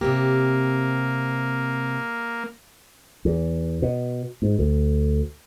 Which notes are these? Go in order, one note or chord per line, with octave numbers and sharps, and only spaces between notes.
C3 A#3 C4 G4
E2
B2
G#2
D2